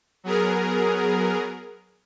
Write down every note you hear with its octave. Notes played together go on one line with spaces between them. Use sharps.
F#3 B3 G#4 A#4